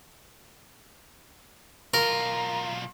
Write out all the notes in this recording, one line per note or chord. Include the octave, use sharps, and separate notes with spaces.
B1 F4 A#4 A#5